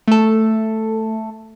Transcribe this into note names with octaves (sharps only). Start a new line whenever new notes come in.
A3 A4